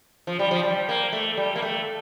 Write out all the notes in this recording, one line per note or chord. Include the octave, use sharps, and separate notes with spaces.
F3
G3
F3
G3
A#3
A3
G3
A#3
A3